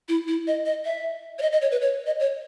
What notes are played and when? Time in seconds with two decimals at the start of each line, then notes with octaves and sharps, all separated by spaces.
0.09 E4
0.28 E4
0.47 D#5
0.66 D#5
0.85 E5
1.39 C#5
1.42 D#5
1.52 D#5
1.62 C#5
1.71 B4
1.81 C#5
2.06 D#5
2.20 C#5